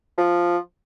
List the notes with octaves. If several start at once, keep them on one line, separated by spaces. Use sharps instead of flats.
F3